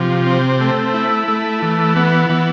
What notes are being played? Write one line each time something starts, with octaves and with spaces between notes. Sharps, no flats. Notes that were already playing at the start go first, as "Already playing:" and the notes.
Already playing: C3 F3
C4
A3
E4
A3
E3
B3
E3